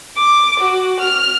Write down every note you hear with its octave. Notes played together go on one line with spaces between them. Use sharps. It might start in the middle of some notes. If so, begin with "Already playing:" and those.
D6
F#4
F6